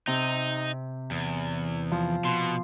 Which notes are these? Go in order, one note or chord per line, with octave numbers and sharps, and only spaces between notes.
C3 D#4
E2
F3
B2 C6